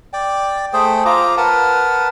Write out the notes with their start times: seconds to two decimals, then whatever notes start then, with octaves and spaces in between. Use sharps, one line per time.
0.13 D5 G5
0.73 A3 G#4 C5 G5
1.05 F4 C5 A#5 D6
1.37 A#4 B4 F#5 A5